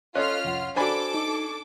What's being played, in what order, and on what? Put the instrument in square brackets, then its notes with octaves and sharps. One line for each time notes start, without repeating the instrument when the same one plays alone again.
[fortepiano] C#4 [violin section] F4 F6 [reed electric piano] A4 D#5 F#6
[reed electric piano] C2 F2 F#5
[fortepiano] D4 G#5 B5 [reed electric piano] F#4 C5 [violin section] A4 D6
[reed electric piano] D#4